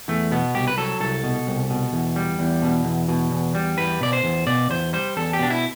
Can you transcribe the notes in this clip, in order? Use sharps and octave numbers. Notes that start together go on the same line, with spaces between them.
E2 A3
B2 B3
C2 G4
B4
F#3 A4
C2 A4
B2
C2
B2
E2
G3
E2
B2
E2
B2
E2
G3
E2 B4
B2 D5
C5
E2
B2 D5
E2 C5
G3 C5
E2 A4
G4
B2 D4
E4